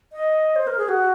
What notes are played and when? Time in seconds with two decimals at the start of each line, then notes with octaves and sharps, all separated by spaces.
0.12 D#5
0.56 C5
0.67 A#4
0.78 G#4
0.89 F#4